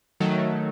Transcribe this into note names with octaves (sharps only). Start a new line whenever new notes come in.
D#3 F#3 A3